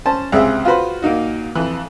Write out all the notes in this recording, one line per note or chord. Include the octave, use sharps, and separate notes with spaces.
C#4 C5 A5
C#2 C3 C4 G#4 E5
F4 F#4 B4 C5
A#2 A#3 D#4 F#4
F2 E3